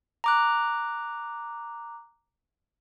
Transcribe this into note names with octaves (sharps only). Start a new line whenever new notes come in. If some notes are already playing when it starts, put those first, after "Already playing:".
A#5 D6 F#6